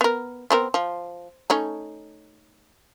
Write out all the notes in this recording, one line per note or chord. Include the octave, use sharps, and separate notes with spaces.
B3 A#4
B3 C4 A#4
F3
A3 C#4 D#4